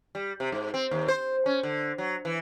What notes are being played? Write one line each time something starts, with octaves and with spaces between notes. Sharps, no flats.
G3
C3
G#2
C4
D#2
C5
C#4
D3
F#3
E3